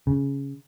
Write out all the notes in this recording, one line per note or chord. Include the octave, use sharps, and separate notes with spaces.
C#3